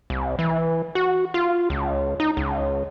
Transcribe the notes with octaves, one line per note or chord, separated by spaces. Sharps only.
C2
E3
F#4
F4
C#2
D#4
C#2